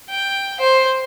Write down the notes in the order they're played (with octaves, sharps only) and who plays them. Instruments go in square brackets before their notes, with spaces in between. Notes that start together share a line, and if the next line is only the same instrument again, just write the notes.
[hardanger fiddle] G5
C5